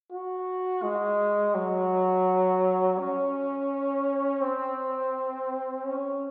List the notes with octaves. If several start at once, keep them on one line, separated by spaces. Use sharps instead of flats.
F#4
G#3
F#3
C#4
C4
C#4